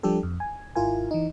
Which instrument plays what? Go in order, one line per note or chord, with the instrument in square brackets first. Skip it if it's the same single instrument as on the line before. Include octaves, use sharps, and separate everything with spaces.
[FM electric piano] F3 G3 D4 G4 A4
F2
G#5
G#1 E4 F4 A#4 G#5
E3 D#4